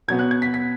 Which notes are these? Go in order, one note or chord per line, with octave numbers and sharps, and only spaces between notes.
B2 F#3 B3 G#6
F#6
G#6
B6
B6